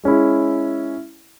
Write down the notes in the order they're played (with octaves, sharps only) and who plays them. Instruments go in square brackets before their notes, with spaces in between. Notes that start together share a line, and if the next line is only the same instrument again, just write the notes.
[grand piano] G#3 C#4 E4